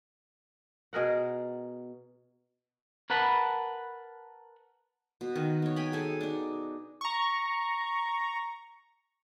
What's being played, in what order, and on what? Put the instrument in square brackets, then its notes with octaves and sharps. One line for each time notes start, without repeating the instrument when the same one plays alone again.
[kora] B2 G#4 A#4 F#5
[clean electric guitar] A#4 B4 F#5 A5 B5
[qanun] B2
D#3
B3 C#5
G5 G#5 B5
G#4 A4 G#5
D4 D#4
[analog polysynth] A#5 C#6